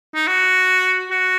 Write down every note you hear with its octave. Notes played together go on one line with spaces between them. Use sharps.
D#4
F#4
F#4